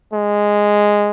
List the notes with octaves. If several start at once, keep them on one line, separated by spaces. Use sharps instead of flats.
G#3